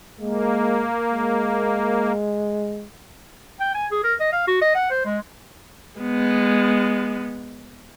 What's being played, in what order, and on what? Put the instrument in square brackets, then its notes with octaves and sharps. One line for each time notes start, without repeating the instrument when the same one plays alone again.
[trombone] G#3 [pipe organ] A#3
[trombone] G#3
[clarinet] G5
G#5
G#4
A#4
D#5
F5
F#4
D#5
F#5
C5
G#3
[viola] G#3 B3